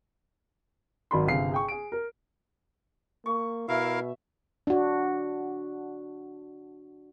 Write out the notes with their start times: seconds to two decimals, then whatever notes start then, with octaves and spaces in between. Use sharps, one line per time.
1.11 G#1 D#3 F#3 D5 B5 C6
1.27 G1 C3 G#4 F5 C7
1.51 G#4 G5 C#6
1.68 G#4 D7
1.92 A#4
3.26 A#3 C#6
3.69 B2 E4 A#4 E5 F5
4.67 D4 F#4